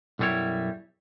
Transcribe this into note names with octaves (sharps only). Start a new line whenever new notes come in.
B1 F#2 G3 E4 C#5